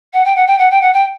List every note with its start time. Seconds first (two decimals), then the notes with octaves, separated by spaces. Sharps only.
0.13 F#5
0.24 G5
0.35 F#5
0.46 G5
0.58 F#5
0.70 G5
0.81 F#5
0.93 G5